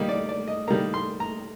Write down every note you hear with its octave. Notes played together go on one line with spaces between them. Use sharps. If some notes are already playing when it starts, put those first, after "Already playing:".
Already playing: D#3 G3 A#3 D#4
D5
D5
D#5
D#3 G3 A#3 A#5
C6
A#5